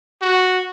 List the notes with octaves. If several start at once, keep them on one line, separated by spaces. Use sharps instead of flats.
F#4